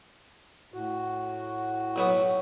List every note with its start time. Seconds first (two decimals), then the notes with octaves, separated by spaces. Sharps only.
0.74 A2 F#4
1.96 B1 F#3 B3